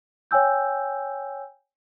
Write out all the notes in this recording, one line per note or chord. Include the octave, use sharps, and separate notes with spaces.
C#5 G5 G#5 E6 G6